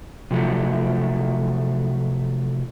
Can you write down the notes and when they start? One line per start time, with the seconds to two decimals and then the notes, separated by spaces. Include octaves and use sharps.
0.31 C3 F3 F#3 A3